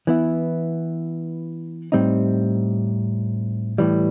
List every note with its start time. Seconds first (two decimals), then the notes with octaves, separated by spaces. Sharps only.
0.07 E3 B3 E4
1.92 A2 G3 C4 D#4
3.78 A2 E3 G3